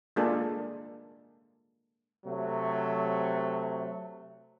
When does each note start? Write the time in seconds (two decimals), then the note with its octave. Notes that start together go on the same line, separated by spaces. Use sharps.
0.16 G#3 A#3 D4 F4 G#4 A4
2.26 C3 F#3 A3